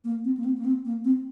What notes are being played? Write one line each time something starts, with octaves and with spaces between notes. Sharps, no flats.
A#3
C4
A#3
C4
A#3
C4
A#3
C4